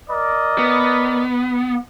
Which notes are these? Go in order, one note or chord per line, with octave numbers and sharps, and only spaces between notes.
A#4 D5 D#5
B3